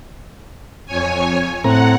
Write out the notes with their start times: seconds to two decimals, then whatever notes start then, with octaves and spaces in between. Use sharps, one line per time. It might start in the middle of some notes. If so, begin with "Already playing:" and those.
0.86 F2 C#5 G#5
1.64 A2 C4 F#5 A#5